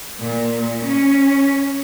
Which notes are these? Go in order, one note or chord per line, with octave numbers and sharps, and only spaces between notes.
A#2
C#4